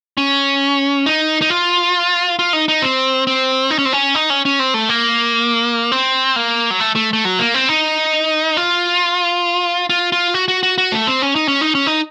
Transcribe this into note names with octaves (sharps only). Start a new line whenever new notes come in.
C#4
D#4
D#4
F4
F4
D#4
D#4
C4
C4
D#4
C#4
C4
C#4
D#4
C#4
C#4
C4
A3
A#3
C4
A#3
F#3
A3
A3
A3
F#3
A#3
C4
D#4
F4
F4
F4
F#4
F#4
F#4
F#4
A3
C4
C#4
D#4
C#4
D#4
C#4
D#4